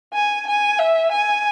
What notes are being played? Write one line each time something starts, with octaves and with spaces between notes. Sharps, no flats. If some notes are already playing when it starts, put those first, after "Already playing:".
G#5
G#5
E5
G#5